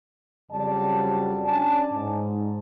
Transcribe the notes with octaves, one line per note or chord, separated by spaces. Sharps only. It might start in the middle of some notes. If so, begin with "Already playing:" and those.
F2 C#3 F#3 G3 D5 A5
C#4 D4 D5 G#5 A5
G#2